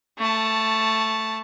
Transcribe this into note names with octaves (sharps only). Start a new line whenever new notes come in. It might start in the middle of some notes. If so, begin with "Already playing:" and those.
A3 A5